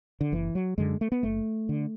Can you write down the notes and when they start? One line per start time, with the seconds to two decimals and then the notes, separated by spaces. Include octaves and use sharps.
0.21 D3
0.32 F#1 E3
0.55 F#3
0.78 F#2 D3 G#3
1.01 A3
1.12 B3
1.23 F#1 A3
1.69 D3